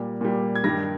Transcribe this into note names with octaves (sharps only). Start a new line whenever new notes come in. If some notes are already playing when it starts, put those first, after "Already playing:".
Already playing: A#2 G3
A#2 G3
G#6
G2 D#3 G3 A#6